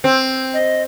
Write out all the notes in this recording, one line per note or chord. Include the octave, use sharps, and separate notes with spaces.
C4
D#5